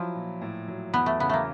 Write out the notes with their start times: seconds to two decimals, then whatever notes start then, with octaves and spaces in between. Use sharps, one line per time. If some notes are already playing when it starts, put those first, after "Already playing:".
Already playing: F3 F#3 E4
0.15 A#2
0.41 A2
0.68 F#3
0.94 E2 B3
1.06 A3
1.19 C#3 B3
1.29 A3 A#3